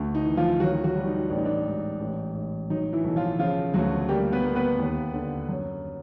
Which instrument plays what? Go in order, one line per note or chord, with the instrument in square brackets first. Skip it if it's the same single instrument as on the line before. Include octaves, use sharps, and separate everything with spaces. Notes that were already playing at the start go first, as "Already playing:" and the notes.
Already playing: [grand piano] D2
D#4
E3
F3 F4
D#3 F#3 F#4
F#3 F#4
G3
D#4
A1 D4
D#4
D4
G#2
A1
A1
F#3 D#4
E3 E4
B1
F3 F4
C#3 F3 F4
D2 F#3 F#4
G3 A#3 G4
B3 B4
A#3
B3 B4
D#2
D3
F#2